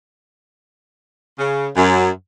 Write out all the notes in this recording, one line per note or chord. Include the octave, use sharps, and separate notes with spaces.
C#3
F#2